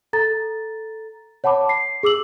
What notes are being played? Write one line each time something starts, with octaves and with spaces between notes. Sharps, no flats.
A4 A#5 A6
C#5 F#5 A5 B5 D6
C7
G#4 D6 E6 F#7